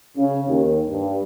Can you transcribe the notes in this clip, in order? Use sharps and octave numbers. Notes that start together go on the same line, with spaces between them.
C#3
D#2
G2